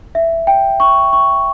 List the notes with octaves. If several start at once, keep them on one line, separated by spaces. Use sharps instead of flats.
E5
G5
C#6
C#6